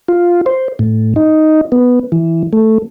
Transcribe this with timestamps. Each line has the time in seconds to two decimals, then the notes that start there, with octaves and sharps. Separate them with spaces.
0.08 F4
0.46 C5
0.79 A2
1.16 D#4
1.72 B3
2.12 E3
2.53 A3